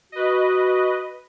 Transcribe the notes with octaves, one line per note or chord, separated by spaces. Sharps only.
F#4 B4 D#5